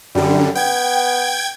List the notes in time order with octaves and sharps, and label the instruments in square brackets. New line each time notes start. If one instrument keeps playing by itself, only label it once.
[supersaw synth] F#2 D3 [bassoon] G3
[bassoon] B3 [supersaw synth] G5 G#6